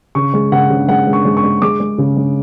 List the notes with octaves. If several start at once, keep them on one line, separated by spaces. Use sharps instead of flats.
C#3 C#6
G#3
C#3 F#5
C#3
G#3 F#5
G#3
C#6
G#3
C#6
G#3
G#3 D6
G#3
C#3
G#3